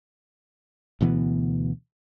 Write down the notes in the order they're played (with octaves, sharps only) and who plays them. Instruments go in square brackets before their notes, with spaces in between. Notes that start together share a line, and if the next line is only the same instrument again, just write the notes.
[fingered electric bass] D2 B2 E3 B3